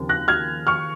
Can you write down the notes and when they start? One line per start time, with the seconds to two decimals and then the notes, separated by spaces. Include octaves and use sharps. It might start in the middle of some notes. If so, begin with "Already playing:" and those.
Already playing: D#2 C#3 F3 C4
0.09 F#6 A#6
0.28 F6 G#6
0.67 C#6 F6